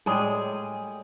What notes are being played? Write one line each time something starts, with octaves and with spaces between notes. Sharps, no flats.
A2 G3 G#3 G#4